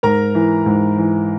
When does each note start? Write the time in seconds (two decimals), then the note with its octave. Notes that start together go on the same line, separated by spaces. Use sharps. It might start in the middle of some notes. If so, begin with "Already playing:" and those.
0.03 G#2 A#4 A#5
0.35 E3
0.66 G#2
0.98 E3